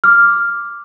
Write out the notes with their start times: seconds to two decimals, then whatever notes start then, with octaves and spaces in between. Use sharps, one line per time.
0.04 D6 F6